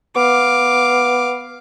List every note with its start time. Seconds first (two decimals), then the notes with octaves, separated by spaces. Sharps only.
0.16 B3 F5 D6